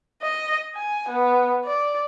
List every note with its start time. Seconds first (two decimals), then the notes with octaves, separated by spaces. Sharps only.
0.23 D#5
0.75 G#5
1.09 B3
1.65 D5